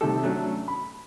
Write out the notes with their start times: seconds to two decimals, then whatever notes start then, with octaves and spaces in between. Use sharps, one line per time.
0.01 C3 D#3 G3 A3 G4 A4
0.23 F#3 A3 C#4 D4 F#4
0.68 B5